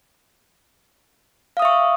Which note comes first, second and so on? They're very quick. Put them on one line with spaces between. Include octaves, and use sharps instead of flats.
F5 D#6 E5 C#6